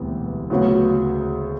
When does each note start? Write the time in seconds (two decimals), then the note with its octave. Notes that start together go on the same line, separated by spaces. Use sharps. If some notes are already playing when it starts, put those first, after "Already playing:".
Already playing: E1 D2 C3 E3 G3
0.50 D2 C#3 F#3 B3